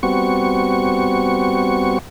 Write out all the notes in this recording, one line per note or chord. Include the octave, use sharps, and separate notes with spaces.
G3 B3 C4 F#4 C#6